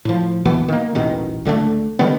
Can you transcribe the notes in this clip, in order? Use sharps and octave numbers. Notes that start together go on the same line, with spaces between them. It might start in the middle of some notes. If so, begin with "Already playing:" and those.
A2 F3
D2 B2 E3 B3
D#3 A#3
D#1 A1 B2 D#3
C#2 D3 F#3 A3
D3 D#3 G3 B3